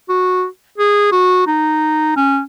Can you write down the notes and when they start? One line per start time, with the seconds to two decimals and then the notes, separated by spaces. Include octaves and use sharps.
0.09 F#4
0.78 G#4
1.12 F#4
1.47 D#4
2.16 C#4